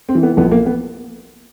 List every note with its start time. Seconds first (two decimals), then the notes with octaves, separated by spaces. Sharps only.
0.09 C4
0.15 E3
0.23 B3
0.37 A#1 B3
0.51 A#3
0.66 B3